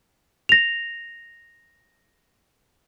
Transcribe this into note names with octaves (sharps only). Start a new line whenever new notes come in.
A#6 F7